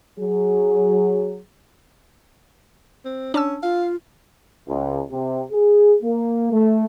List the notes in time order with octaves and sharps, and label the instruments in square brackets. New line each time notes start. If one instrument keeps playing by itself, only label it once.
[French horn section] F#3 G#4
[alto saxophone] C4
[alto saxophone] C#4 [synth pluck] D4 A5 E6
[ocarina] F4 [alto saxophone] F5
[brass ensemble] C#2
C3
G#4
A#3
A3